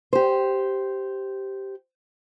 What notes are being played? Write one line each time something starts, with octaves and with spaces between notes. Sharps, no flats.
G4 C5